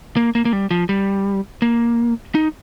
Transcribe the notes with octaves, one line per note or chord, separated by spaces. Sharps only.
A#3
A#3
A#3
G3
F3
G3
A#3
D#4